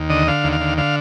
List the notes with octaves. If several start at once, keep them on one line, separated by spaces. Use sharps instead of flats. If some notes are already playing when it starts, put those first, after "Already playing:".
Already playing: D#2
D3 D#5
D3 F5
D#2
F5
D3
D3 F5